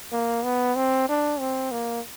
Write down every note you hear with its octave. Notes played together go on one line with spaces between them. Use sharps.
A#3
B3
C4
D4
C4
A#3